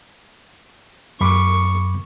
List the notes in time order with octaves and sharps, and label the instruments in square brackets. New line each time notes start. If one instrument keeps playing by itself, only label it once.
[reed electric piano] F#2 B5 D6 [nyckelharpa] C#6